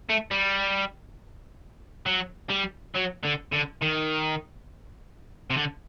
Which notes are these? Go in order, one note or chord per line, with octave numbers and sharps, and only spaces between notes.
A3
G3
F#3
G3
F#3
D3
D3
D#3
C3
D3